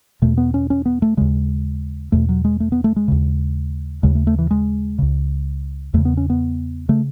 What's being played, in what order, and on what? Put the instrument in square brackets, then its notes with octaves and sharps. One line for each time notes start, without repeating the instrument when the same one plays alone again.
[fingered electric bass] E2 B2 A3
B3
C#4
C#4
B3
A3
D#2 C#3 G#3
E2 B2 A3
F#3
G#3
A3
B3
A3
G#3
D#2 C#3
D#2 C#3 G#3
A3
A3
E3
G#3
C#2 C#3
E2 C#3 A3
B3
C#4
B3
C#3 A3